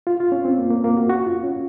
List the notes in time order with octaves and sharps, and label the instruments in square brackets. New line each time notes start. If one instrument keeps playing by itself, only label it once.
[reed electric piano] F4
F4
C#4
C4
A#3
A#3
A#3
F#4
F#4
F4
C#4